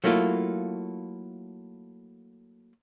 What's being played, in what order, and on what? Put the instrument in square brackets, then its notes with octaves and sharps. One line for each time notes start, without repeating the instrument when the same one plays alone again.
[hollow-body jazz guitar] F#3 A3 A#3 E4 F4